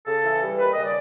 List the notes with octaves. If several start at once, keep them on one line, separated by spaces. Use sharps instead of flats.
C#3 A4
E3
G3
D#2 B4
C#3 D#5
D5